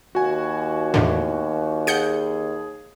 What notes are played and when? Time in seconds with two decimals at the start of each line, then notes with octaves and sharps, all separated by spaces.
0.15 D#2 F#4 G#5
0.94 E2 A2 D3
1.87 G#4 F#5 G6 C#7